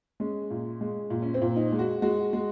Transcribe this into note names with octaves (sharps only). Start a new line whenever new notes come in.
G#3 C#4
A#2
G#3
A#2
C#4
C4
A#2
D#4
G#3
F#4
G#3 F#4
G#3